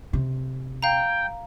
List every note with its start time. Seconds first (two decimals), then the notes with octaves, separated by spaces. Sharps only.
0.13 C3
0.83 F5 G5 A#5